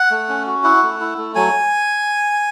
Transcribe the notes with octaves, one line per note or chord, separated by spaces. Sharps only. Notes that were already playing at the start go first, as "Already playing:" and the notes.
Already playing: F#5
A3
C#4
F#4
E4 F#5
A3
E4
A3
F#3 G#5